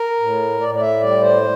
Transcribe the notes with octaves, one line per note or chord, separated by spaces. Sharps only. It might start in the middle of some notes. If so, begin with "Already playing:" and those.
Already playing: A#4
A2
A2 D5
D5
E5
G3 D5
C5